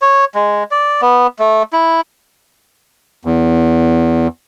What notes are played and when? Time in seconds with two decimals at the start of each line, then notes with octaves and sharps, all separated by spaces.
0.02 C#5
0.35 G#3
0.71 D5
1.02 B3
1.39 A3
1.73 E4
3.25 E2